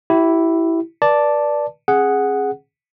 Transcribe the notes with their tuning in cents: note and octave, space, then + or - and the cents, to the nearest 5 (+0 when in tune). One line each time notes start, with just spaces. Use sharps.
E4 +0 G4 -35
B4 -40 D5 +0 A5 +0
C#4 -40 G#4 +0 F#5 +0